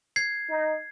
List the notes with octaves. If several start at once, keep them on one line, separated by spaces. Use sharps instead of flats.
G#6 C7
D#4